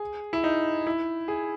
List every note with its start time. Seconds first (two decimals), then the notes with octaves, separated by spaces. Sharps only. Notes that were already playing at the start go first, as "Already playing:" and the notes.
Already playing: G#4
0.33 E4
0.44 D#4
0.87 E4
1.28 G#4